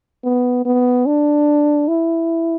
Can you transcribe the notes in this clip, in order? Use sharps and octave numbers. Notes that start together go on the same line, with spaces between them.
B3
B3
D4
E4